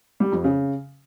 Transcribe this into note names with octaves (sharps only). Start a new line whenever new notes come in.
G3
F2
C#3